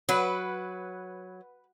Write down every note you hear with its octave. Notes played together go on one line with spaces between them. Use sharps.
F#3 B4 F#5